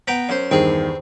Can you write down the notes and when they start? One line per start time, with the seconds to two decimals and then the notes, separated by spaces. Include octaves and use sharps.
0.08 B3 G5 A#5
0.29 F#2 C5
0.51 E2 G2 D#3 C4 G#4